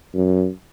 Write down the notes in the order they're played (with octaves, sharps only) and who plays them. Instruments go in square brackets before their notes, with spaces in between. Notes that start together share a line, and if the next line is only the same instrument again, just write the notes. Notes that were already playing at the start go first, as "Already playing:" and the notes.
[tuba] F#2